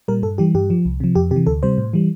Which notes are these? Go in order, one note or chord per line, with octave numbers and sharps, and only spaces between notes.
A#2 G3 A#4
G2 A4
E3 G3 G4
G2 G4
F3
C2
C3 F3
F2 G4
C3 G4
E3
D2 A4
C3 G3 C5
A2
E3 G3